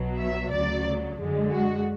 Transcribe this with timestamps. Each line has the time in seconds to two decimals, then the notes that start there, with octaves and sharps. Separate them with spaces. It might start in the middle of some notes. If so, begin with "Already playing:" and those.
Already playing: B1 B2 F#3
0.18 E5
0.51 D2 C#3 F#3 D5
1.17 F#2 D3 G#3
1.50 F#4